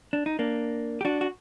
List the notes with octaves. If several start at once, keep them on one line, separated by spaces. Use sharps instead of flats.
D4
D#4
A#3 D4
G4
D4 F#4
F#4